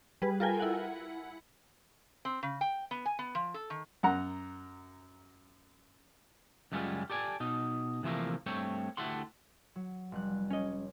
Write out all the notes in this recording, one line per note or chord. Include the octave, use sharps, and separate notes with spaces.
G3 G#4 B4
F4 A4 A#4 G5 G#5
E4 F#5
C4
C#3
G5
B3
G#5
B3
F3
A4
D#3
F#2 F#5 A#5
C#2 F#2 G3 G#3 C#4 F4
G4 A4 D5 G#5
B2 D#4
C3 E3 F3 A3 A#3
G2 A3 C4 C#5 G5
D2 A3 E4 G4 F#5 C6
F#3
F1 G3 F#6
C#4 C#5 D#5